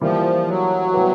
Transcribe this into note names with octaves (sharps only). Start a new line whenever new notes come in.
E3 F3 G3 A#3
F#3
G3 B3 E4 G4 B4